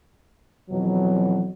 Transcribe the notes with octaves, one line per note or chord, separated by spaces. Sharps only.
F2 B2 E3 F#3